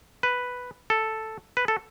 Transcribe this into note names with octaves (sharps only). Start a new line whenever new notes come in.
B4
A4
B4
A4